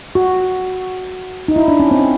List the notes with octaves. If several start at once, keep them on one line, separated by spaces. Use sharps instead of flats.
F#4
D#4
E4
D4
C#4
C4